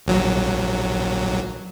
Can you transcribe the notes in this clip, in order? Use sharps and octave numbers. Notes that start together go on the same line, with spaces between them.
A#1 F#3